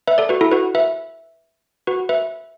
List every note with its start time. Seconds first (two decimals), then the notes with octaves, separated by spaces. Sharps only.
0.07 B4 E5
0.18 A4 D5
0.29 F#4 B4
0.41 E4 A4
0.51 F#4 B4
0.75 B4 E5
1.87 F#4 B4
2.09 B4 E5